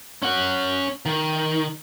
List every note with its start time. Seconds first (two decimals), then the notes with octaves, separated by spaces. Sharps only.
0.22 C#4 F#5
1.06 D#3